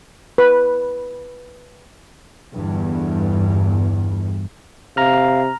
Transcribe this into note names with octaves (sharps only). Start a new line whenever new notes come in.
B4
G1 E2 G2
C3 F5 A#5 F6